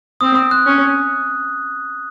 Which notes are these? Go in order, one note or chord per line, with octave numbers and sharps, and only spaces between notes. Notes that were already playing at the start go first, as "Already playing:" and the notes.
C4 D#6
D#6
F#6
C#4